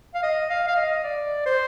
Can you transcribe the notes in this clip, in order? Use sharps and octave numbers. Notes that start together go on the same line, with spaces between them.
F5
D#5
F5
F5
D#5
D5
C5